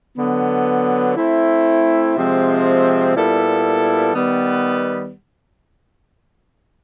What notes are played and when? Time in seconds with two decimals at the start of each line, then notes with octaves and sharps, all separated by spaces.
0.16 D3 F#3 B3
1.16 A3 C4 E4
2.15 C3 F3 G#3 C4
3.14 A#2 G3 B3 E4 A4
4.13 D#3 G3 B3